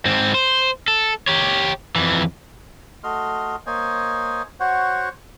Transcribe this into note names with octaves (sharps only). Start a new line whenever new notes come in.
G#2 C4
C5
A4
G4 C#5
F2 E3
A3 F#4 D#5 C6 F6
A#3 C5 C#5 D#5 G#5
F#4 C5 C#5 F#5